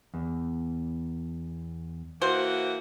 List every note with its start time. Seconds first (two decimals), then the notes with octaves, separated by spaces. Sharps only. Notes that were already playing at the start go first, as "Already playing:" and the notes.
0.14 E2
2.22 E3 A#3 F#4 C5